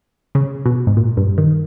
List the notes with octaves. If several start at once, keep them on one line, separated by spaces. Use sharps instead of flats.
C#3
B2
G#2
A#2
G2
D#3